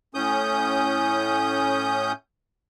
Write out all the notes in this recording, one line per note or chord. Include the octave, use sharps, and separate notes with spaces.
A2 C#4 D#6 G6